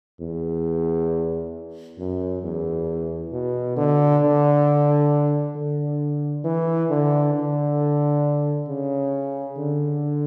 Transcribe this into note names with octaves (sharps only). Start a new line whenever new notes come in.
E2
F#2
E2
B2
D3
D3
D3
E3
D3
D3
C#3
D3